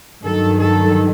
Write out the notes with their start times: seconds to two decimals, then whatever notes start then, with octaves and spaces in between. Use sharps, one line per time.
0.22 G2 D#3 F#3 A4
0.57 A4